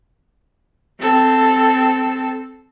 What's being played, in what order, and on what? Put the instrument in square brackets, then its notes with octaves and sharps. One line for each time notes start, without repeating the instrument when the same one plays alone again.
[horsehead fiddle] C4 A4